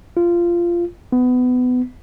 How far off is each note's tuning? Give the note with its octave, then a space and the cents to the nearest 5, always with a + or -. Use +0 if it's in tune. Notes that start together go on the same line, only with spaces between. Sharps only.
F4 -15
B3 +20